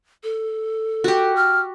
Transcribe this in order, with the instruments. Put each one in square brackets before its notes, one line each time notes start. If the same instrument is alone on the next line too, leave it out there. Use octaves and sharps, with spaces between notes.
[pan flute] A4
[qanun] F#4 G4
[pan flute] F6